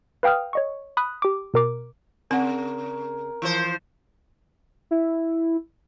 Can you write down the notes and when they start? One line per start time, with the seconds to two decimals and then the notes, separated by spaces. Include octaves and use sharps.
0.23 B4 F5 G5 D#6 F6
0.53 C#5 D#5 C#6
0.97 B5 D#6 F#6
1.22 G4 D6
1.54 B2 A#4 D6
2.31 C#3 C4 A#4 F#5
3.42 E3 F3 C5
4.91 E4